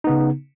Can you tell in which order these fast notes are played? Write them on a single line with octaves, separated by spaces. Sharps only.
D#4 B3 C#3